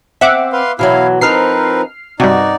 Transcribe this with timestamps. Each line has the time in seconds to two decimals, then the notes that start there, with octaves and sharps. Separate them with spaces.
0.21 C4 E5 F#5 D6
0.52 B4 F5 C6
0.79 B2 E3 F#3 E4 F5
1.21 F3 C4 D#4 A#4 B4 F6 C7
2.20 G2 C3 D#4 F#4 D5